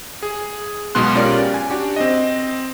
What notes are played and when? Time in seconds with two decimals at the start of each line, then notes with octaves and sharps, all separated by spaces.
0.23 G#4
0.95 B1 B2 G#3 B3 C6 F#6
1.15 C#4 F4 G4 A#4 D5
1.54 G#5
1.70 D4 F#4 G4
1.96 C4 D#5